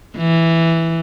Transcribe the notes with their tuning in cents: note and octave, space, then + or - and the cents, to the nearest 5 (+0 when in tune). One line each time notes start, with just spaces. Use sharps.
E3 +0